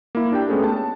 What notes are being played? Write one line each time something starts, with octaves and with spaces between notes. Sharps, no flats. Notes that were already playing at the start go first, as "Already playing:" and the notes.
A#3 E4
D4 G4 G5
G#3 A3 B3 C#4 G#4 A4
A5